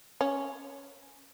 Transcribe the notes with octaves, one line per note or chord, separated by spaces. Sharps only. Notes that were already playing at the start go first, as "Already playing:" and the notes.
C#4